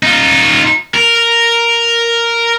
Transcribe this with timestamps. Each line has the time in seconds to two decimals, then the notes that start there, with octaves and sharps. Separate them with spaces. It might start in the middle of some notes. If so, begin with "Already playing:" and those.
0.03 D#4 F4
0.94 A#4